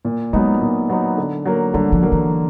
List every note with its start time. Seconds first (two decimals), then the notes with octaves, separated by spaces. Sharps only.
0.05 A#2
0.33 F#3 G#3 B3 D#4
0.62 A#2
0.89 F#3 B3 D#4
1.17 D3
1.46 F#3 A#3
1.74 D3 G3
1.92 F3
2.02 F#3 A#3
2.12 E3